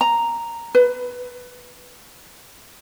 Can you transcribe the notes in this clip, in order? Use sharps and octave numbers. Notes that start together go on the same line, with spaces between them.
A#5
B4